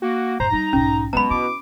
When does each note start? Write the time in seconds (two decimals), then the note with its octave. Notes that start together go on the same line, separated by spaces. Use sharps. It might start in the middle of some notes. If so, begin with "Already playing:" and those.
0.02 A#3 F#4
0.40 F#2 A2 C5 A#5
0.52 G3 A#3 D#4
0.73 B1 G#2 C#4
1.13 B2 F#3 G#3 A#5 B5
1.31 E4 D6